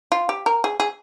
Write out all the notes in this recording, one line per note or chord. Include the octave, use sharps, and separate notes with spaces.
F4
G4
A#4
G#4
G#4